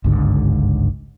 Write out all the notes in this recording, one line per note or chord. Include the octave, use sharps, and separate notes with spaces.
G1 C#2 G#2 D3